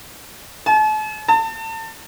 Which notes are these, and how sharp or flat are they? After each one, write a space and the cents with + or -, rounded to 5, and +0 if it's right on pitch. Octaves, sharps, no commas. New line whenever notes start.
A5 -40
A5 +35